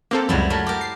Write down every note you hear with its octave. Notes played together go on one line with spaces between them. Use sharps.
A#3 C4 G4 A4
C#2 F#2 F#3 G3 E4
F#3 A3 A#4
G4 A#4
C7